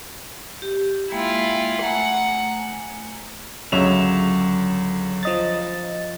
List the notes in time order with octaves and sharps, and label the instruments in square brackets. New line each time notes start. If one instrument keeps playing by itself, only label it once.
[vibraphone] G4
[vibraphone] G#3 A#3 G5 [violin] E4 F4
[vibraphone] A3 G#5 A#5 [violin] F#5
[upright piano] C#2 C#5 F7 [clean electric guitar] D3 F#3 E5
[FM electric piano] F3 D#5 A6